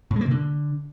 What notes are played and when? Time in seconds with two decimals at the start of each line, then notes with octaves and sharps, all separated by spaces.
0.11 A2
0.16 G#3
0.21 A#3
0.26 C3
0.31 D3